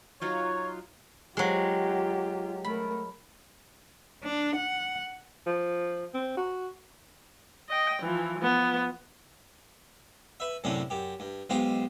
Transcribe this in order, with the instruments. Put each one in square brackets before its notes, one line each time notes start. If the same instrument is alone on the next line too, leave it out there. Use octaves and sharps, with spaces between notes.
[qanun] F#3 D#4 F#4 [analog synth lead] F4 [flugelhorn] C#5
[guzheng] F#3 G#3 [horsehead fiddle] F4 G4
[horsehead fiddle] A3 A#4 [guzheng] B5
[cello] D4
F#5
[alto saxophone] F3
C4
F#4
[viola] D#5 G5
E3 F3
F3 B3
[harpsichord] B4 E5
F#2 A2 C3 C#4 D4
F#2 G4
G2
B1 G#3 F4 G4 C5